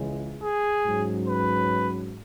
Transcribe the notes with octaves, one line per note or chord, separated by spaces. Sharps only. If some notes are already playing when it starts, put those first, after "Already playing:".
Already playing: C#2 C#3 E3 G#3
G#4
G#2 F#3 C#4
B4